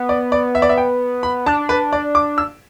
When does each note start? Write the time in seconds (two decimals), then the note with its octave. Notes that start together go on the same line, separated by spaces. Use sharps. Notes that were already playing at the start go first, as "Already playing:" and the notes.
Already playing: B3
0.09 D5
0.32 D5
0.55 E5
0.62 D5
0.69 E5
0.78 G5
1.23 B5
1.46 D4 A5
1.69 B4
1.93 D5
2.15 D6
2.38 E6